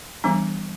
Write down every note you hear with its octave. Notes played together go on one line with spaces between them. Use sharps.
E3 G3 B3 D4